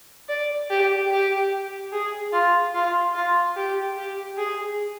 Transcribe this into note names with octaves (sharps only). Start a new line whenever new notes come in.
D5
G4
G4
G#4
F4
F4
F4
G4
G4
G#4